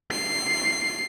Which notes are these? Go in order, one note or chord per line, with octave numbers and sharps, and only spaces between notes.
C7